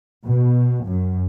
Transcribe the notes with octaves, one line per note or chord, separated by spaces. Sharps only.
B2
F#2